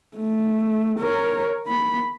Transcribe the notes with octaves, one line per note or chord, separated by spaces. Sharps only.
A3
A#4 C#5
A#3 B5